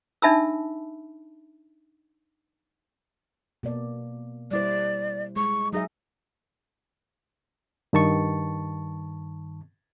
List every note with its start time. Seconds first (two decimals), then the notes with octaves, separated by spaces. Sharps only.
0.22 D4 D#4 E5 A5 B5 E6
3.63 B2 A#3 D5
4.51 G3 E4 C5 D5
5.36 G#3 C#6
5.73 F#3 D#4 G#4 E5
7.93 G2 D#3 A5 C#6